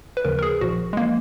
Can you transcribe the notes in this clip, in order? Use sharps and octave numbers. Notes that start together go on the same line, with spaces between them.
B4
D#2 C#3 F3 A#4
A#4
G#4
A#1 A#2 F3 F#4
G#3
F3 A#3